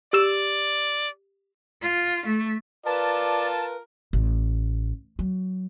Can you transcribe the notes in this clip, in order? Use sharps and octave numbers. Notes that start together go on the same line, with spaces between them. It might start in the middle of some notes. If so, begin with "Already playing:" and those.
G4 D5 E6 E7
F4
A3
F4 A#4 B4 D5 A5
A1
F#3